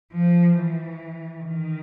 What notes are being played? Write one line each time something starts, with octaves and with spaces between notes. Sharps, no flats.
F3
E3
D#3